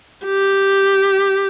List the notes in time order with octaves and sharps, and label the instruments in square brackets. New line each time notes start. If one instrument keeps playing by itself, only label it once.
[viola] G4